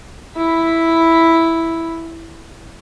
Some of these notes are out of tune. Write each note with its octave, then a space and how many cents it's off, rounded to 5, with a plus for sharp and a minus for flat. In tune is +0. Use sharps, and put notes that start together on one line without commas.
E4 +0 B5 +0